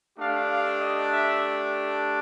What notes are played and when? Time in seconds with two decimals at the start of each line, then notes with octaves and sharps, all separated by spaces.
0.18 A3 D4 G4 F5
0.50 F5
0.80 D#5
1.11 E5